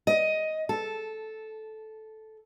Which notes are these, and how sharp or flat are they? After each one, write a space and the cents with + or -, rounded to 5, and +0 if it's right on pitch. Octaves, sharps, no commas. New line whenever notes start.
D#5 +10
A4 -10